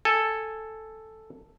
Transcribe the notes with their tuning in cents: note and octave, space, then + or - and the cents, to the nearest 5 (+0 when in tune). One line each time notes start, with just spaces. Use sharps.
A4 +0 G#5 +0